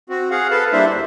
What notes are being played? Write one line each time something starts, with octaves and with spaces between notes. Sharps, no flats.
C4 F#4
G#4 F5 F#5
A4 B4 F5 A5
G3 A#3 D4 E4 C5 E5
D2